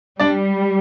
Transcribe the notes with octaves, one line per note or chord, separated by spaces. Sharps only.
G3 D4 D5